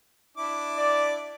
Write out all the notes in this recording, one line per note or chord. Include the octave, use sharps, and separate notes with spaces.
D4 E4 D6
D5